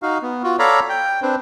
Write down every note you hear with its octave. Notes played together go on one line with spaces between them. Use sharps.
D#4 F#4 F5
B3
F4 F#4
A4 C#5 D5 F5 A#5 B5
G5
C4 D4 B4 C5